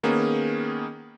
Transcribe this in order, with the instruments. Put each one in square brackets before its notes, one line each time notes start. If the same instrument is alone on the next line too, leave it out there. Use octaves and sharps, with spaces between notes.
[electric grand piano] D#3 A#3 B3 C#4 G#4